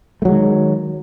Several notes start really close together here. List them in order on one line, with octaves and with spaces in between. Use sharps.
A3 F#3 G#3 D#3